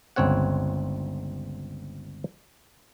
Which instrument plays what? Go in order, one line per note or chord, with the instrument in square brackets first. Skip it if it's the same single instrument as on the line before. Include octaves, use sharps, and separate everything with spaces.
[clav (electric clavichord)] G1 C#2 C4 C#5 F#5